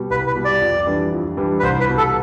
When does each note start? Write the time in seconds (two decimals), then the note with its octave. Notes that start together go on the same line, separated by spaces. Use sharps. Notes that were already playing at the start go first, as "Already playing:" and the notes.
Already playing: B2 G3
0.10 C2 B4
0.27 B4
0.35 B2 G3
0.45 D5
0.61 F2
0.87 E3 G3 D4
1.12 F2
1.37 E3 G3 D4
1.59 B4
1.63 C2 C5
1.80 B4
1.89 B2 G3
1.98 A4